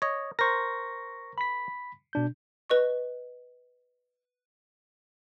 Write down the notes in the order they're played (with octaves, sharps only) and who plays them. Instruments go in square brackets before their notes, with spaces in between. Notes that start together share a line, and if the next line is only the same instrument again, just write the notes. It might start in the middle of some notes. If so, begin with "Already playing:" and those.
[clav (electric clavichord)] C#5 D#5
[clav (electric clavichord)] A#4 C5 [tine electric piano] C#6 A#6
[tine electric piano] B5 B6
B2 D4 G6
[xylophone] B4 D#5 C#6